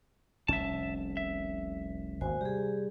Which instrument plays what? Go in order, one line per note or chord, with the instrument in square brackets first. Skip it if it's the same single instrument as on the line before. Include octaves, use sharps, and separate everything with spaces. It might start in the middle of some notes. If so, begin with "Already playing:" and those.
[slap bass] F1 C2 C#4 [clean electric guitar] E5 A5
[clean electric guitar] E5
[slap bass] G#1 D#2 [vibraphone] F#4 C5 G#5
[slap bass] C3 G3 [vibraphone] G4 G#4